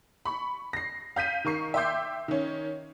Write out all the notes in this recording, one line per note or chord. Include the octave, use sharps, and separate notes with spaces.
B5 C#6
A#6 C7
F5 G6 B6 D#7
D#3 A#4 C#6 C7
E5 G5 C6 D6 G6 C7
D#3 C#4